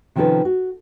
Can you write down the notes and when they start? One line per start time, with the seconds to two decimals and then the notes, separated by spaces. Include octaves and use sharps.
0.16 C3 D#3 F3 C#4 A4 B4
0.45 F#4